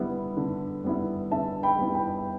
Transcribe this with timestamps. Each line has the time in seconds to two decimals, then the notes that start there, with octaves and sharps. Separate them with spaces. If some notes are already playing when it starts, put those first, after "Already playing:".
Already playing: D3 G3 B3 E4
0.37 D3
0.84 G3 B3 E4
1.31 D3 E5 A5
1.63 G5 B5
1.79 G3 B3 E4
1.95 G5 B5